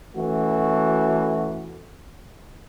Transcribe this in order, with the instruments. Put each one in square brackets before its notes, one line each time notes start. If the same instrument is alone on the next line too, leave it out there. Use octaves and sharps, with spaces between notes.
[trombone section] E3 A3 C#4 F#4